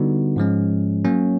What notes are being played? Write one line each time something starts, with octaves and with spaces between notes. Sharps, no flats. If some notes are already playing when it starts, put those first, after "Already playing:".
Already playing: D3 G3 B3 D#4 F#4
G#2 F3 G#3 C#4
F#3 A#3 C#4